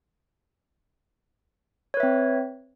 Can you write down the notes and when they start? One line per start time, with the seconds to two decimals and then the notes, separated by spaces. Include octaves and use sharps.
1.94 C#5
1.97 B4
2.00 E5
2.03 C4